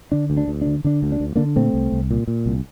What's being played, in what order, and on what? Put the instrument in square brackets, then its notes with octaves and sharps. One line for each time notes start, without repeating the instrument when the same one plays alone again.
[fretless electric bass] D3 D4
D2
D4
D2
D3 D4
D3 D4
D2
D4
D2
D3 A#3 D4
A#2 A3 C4
C2
C2
A#2
A#2
C2